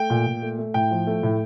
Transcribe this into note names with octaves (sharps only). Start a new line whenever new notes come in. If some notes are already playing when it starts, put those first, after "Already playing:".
Already playing: A3 G5
A#2
A#2
A3
A3
A2 G5
F3
A3
A2